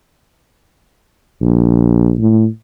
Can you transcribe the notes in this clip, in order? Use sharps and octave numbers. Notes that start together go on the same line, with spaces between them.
A#1
A2